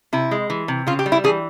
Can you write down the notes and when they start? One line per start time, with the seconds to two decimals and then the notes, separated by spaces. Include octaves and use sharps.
0.13 C3 E4
0.31 G#3
0.50 E3
0.68 C3
0.87 C#3 F4
0.99 G4
1.06 G3
1.12 E4
1.24 E3 G#4